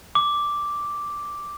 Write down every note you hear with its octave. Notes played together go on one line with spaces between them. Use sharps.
D6